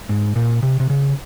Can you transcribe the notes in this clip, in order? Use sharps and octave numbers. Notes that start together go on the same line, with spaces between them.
G#2
A#2
C3
C3
C#3